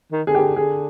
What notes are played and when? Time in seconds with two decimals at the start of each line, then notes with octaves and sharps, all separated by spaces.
0.12 D#3
0.27 D3 G#4
0.35 D#3 G4
0.41 D3
0.56 D3 G#4